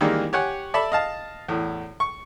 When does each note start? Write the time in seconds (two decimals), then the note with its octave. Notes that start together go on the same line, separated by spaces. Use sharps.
0.01 D#3 E3 G3 G#3 A#3 D4
0.33 G4 C#5 F#5 G#5
0.74 A4 D5 E5 A5 B5
0.92 D#5 F5 A5
1.48 E2 A2
2.00 C#6